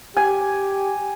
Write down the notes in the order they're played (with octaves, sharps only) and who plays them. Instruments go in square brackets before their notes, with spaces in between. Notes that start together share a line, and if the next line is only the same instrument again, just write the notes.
[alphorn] G4 [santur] G#5